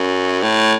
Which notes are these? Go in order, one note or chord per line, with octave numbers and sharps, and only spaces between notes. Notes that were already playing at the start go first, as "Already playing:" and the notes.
Already playing: F#2
A2